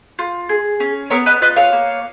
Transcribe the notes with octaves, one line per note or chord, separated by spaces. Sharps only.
F4
G#4
C#4
B3 A#4 C#5
B4 D#5
F4 B4 D#5
C#5 F5
A#3